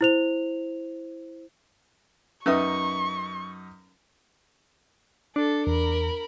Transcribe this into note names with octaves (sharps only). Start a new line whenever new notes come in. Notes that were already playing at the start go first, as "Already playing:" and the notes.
E4 C5 F7
F#2 C#4 D#4 B4 E5 C#6 D#6
D4 A4
E2 A#4 B5